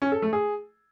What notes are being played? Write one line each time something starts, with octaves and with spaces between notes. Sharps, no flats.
C#4
A4
A3
G#4